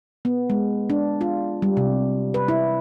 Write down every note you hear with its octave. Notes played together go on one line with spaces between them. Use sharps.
B3
G#3
D4
F4
G3
C3
B4
E4